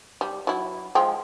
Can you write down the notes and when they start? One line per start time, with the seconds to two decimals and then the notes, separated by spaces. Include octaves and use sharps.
0.21 G3
0.47 F#3 E4
0.95 F3 G#3 G5